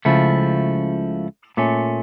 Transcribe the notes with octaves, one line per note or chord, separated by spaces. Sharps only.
C#2 C#3 F3 A3 E4
A#2 A3 C#4